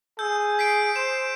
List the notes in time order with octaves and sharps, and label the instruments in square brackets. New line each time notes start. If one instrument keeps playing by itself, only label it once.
[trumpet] G#4 [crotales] E6 G6
[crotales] B6 C7 D7
[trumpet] C5 [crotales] E7